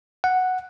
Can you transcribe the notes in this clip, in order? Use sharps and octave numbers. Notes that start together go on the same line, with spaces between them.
F#5